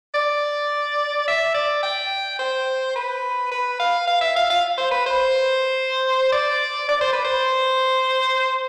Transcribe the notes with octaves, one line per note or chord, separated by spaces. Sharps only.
D5
E5
D5
G5
C5
B4
B4
F5
F5
E5
F5
F5
C5
B4
C5
D5
D5
C5
B4
C5